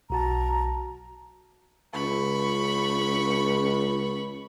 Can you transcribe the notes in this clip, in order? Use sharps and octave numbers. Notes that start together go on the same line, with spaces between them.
B1 F#4 A5 A#5
C#2 B5 C#6